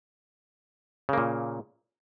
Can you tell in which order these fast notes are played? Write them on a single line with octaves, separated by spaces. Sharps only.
C#3 A#3 A#2